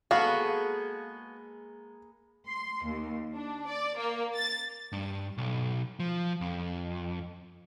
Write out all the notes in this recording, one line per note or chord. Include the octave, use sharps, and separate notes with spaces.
G#3 A#3 B3 F#4 A4 B4 F5
C6
D#2
D4
D5
A#3
A6
G2
B1
F3
F2